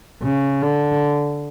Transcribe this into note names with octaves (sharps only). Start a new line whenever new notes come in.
C#3
D3